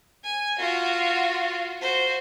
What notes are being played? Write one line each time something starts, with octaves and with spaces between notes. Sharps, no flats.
G#5
F4 F#4
F#4 C5